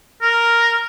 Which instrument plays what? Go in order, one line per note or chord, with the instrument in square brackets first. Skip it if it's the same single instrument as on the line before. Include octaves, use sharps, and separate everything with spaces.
[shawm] A#4